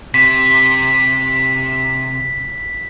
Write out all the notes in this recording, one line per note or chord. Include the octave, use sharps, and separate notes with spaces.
C3 B6